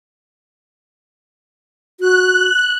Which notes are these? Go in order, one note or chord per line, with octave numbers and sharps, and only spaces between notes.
F#4 F#6